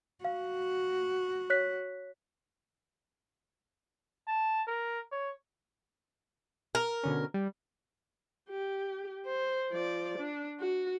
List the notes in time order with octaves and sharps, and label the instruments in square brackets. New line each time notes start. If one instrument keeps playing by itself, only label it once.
[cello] F#4 [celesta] F5
[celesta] C#5 F#6 B6
[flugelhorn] A5
A#4
C#5
[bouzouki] A#4
[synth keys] B2 D3 C#4
G3
[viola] G4
C5
F3 D5
D4
F#4